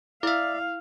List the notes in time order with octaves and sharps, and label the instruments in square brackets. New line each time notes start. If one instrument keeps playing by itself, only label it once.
[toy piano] E4 [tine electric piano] D5 E5 [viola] F5